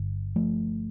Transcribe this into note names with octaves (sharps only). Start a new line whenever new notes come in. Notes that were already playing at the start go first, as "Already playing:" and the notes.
Already playing: G1 G2 D3
F3 A3